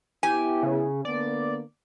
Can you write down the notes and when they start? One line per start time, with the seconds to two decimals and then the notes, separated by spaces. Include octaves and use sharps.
0.23 B3 E4 G4 G#5
0.63 C#3
1.05 D3 A#3 B3 D5